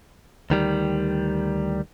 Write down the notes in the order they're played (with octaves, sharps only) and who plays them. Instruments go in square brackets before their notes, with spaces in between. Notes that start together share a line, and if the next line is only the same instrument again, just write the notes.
[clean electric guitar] D2 D#3 G3